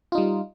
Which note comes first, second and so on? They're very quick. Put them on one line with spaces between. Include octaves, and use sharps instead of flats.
F4 D#4 G3